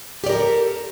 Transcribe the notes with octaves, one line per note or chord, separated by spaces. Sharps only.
G4 A4 A#4 D5